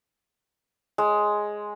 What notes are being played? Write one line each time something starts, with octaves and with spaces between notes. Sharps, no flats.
G#3